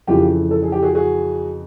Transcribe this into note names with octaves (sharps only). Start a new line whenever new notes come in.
F2 C#3 E3 F4 G4
A4
G#4
G4
F#4 G#4
F#4 G#4